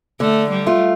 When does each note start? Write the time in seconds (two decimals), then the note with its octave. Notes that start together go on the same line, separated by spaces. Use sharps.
0.20 D3 A3
0.51 G3
0.66 A3 F4